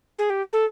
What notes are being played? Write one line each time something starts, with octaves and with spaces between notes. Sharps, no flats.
G#4
G4
A4